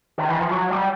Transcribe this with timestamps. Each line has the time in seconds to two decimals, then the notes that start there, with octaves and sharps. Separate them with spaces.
0.18 D#3
0.29 E3
0.40 F3
0.50 F#3
0.71 G3